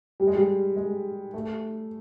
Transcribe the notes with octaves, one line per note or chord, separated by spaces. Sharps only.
G3
G#3
G3
G#3
A3